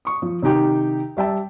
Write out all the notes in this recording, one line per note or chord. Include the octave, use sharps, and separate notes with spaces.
C#6 D#6
F3
C3 D#3 D#4 G4 G5
G3 E5 G5 A5